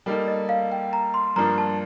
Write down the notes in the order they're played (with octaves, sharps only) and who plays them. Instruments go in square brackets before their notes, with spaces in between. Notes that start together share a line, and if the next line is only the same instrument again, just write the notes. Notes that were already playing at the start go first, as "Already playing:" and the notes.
[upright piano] G3 A#3 D#4 A4
[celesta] D#5
F5
G5
A#5
C6
[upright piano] G2 F3 A#3 D4 [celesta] A#5
[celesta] A5